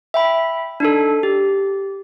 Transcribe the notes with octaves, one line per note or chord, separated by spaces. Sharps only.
E5 G5 B5
D4 D#4 A4
G4